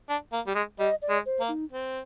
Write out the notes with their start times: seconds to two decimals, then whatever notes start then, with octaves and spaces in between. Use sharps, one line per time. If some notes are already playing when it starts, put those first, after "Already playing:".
0.09 D4
0.32 A#3
0.47 G3
0.55 G#3
0.79 G3 D#5
1.02 D5
1.09 G#3
1.25 C5
1.40 A#3
1.48 D#4
1.72 C4